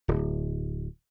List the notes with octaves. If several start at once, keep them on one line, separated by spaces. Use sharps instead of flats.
D1